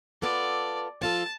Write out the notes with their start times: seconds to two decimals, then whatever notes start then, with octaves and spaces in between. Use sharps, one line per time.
0.22 B3 F4 A4 D5
1.02 F3 F4 A4 A5